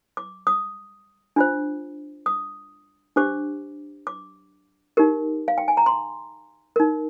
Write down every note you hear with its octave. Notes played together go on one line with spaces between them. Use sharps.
D6
D#6
D4 F4 C5
D#6
D4 G4 C5 D6
D6
D#4 G4 A#4
F5
G5
G#5
A#5
C6
D#4 A#4